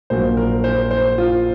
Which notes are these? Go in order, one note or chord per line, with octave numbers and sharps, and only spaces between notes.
A#1 A#2 F#3 A#3 C5
A#4
C5
C5
F4